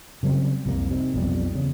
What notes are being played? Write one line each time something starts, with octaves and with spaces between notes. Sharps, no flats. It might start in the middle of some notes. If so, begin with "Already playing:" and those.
C#3 F#3 G3 C4
C2 F2 G3 A#3
C3 D#3
B1 F2 G3
E2 C#3